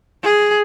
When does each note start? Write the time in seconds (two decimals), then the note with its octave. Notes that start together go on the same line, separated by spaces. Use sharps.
0.23 G#4